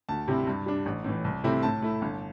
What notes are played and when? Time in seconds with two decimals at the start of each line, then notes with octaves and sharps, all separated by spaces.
0.09 D2 A5
0.28 C3 G3 C4 E4
0.47 G2
0.66 G3 D4
0.86 A1
1.04 A2 E3
1.24 C2
1.44 C3 A3 C4 E4
1.63 A2 A5
1.82 A3 E4
2.02 G1